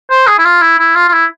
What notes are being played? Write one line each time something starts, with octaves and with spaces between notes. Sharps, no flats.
C5
G#4
E4
F4
E4
E4
F4
F4
E4